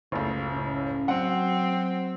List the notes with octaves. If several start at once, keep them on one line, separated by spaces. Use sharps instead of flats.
F#1 C#2 C#3 A3
A2 C#4
F#3 C4 F#5